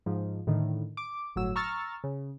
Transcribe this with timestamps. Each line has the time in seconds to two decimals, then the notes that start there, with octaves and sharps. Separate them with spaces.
0.06 G#2 F3
0.47 A2 D3 D#3
0.97 D6
1.36 G1 A2 F#3 E6
1.56 A#5 C#6 E6 F6 A6
2.04 C#3